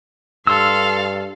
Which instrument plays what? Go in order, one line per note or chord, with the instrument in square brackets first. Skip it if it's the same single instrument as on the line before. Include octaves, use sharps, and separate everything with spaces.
[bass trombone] G2 [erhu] A4 [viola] F5 [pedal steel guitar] C6 E6